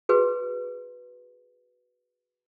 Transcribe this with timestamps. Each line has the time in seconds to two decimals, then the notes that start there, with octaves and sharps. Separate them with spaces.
0.09 F#4 G#4 B4